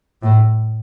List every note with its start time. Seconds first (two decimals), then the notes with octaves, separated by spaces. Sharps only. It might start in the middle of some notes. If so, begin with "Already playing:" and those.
0.22 A2